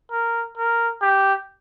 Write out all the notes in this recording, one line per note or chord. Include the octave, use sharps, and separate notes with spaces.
A#4
A#4
G4